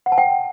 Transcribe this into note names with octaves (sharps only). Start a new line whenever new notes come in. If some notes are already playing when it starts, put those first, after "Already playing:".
F#5
A5
G5